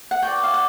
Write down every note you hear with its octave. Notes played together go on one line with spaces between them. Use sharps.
F#5
F#4 B4 D5 G5
F5
F#5